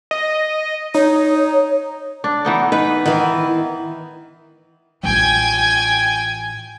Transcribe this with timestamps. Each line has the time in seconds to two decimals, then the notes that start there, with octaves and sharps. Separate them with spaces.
0.11 D#5
0.95 D#4 C#5
2.24 D4
2.45 E3 B3 D#4
2.72 D#4 B4
3.06 D#3 E3 B3
5.03 A1 F4 G5 G#5 G#6